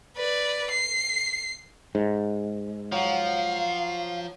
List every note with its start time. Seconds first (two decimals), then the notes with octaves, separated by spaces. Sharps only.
0.16 B4 D5
0.71 C7
1.95 G#2
2.92 F3 F#3 F5 F#5